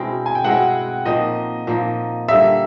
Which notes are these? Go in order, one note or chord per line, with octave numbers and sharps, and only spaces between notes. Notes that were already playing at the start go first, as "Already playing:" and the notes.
Already playing: B2 G#3 C4 D4 E4 G5
G#5
G5
B2 G#3 C4 E4 F#5
A#2 F3 A#3 D#4 D#5
A#2 F3 A#3 D#4
D3 G3 A#3 E5